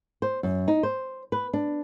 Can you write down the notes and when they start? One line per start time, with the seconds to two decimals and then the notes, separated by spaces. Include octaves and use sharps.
0.22 C5
0.43 F#2
0.68 D#4
0.83 C5
1.32 B4
1.53 D4